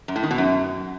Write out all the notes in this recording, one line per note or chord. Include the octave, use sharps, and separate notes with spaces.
F#2
A2
D#3
B2
F#2